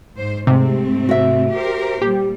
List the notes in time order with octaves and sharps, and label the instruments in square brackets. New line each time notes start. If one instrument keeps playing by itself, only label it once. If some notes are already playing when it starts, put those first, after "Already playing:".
[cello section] G#2 C5
[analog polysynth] G#2 C3 [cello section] A3 C4
[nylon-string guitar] F#4 E5
[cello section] G4 A#4 C5
[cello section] A#2 G3 [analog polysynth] G4